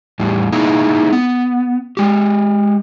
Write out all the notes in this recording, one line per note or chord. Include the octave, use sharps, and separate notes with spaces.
E2 A2 G3
A#3 D#4 E4 G#4
B3
G#3 G4